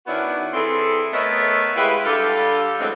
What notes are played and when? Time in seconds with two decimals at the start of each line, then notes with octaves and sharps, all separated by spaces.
0.06 D#3 B3 C#4 D4 E4 F#4
0.53 E3 C4 E4 G#4 A4
1.12 A3 B3 A#4 C#5 D#5 E5
1.76 G#3 E4 G4 B4 E5 F5
2.05 D3 G3 F4 G4 A4
2.79 A2 D3 E3 F#3 G#3 C4